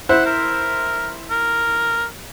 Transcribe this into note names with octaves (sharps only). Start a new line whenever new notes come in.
E4 C5 F#5
A#4
A#4